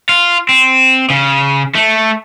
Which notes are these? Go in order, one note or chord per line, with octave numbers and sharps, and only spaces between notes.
F4
C4
C#3
A3